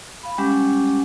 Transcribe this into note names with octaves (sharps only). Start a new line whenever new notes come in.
F5 B5
G3 G#3 C#4 G4 F#5 D6